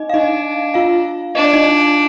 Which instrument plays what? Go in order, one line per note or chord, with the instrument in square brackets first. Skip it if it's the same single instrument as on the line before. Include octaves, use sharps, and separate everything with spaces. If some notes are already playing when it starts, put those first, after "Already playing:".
Already playing: [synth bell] D#4 D#5
F5
[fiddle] D4 [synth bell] D#4 D#5
[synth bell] F4 F5
[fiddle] D4 [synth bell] D#5
[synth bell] D5
D#4 D#5